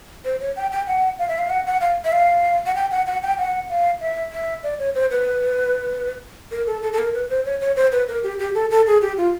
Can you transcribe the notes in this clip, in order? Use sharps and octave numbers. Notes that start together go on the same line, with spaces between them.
C5
C#5
G5
G5
F#5
F5
E5
F5
F#5
F#5
F5
E5
F5
F#5
G5
F#5
F#5
G5
F#5
F5
E5
E5
D5
C#5
C5
B4
A#4
A4
A4
A4
A#4
B4
C5
C#5
C#5
C5
B4
A#4
G4
G4
A4
A4
G#4
G4
F4